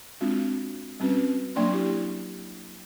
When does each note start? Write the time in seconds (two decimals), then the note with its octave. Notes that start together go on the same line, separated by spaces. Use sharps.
0.21 G#3 C4 D4 F4 F#4
1.00 G3 C4 C#4 F#4 B4
1.55 F#3 A#3 D4 D5 C6 C#6
1.72 E4 G4